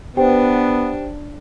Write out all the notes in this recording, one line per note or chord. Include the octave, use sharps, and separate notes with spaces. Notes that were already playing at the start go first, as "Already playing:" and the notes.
B3 D4 G4 C5 G5